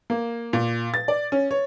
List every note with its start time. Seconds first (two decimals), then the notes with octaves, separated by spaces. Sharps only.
0.10 A#3
0.53 A#2
0.94 A6
1.08 D5
1.32 C#4
1.51 C#5